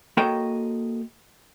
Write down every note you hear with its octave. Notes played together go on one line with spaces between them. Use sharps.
A#3 F#4 A4 C#5 D#5 G5